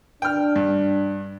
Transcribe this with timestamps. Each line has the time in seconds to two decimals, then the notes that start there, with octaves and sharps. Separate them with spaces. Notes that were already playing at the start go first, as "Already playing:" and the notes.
0.22 D4 G5 F6
0.56 G2